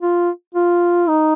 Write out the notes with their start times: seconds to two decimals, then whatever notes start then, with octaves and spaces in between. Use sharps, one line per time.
0.02 F4
0.55 F4
1.08 D#4